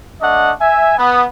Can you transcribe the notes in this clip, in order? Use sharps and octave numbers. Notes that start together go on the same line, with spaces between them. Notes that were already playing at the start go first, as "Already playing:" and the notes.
A3 D4 D#5 F#5
E5 G#5
B3